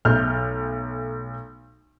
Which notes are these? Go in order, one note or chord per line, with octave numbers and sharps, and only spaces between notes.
B1 A3 F6 G6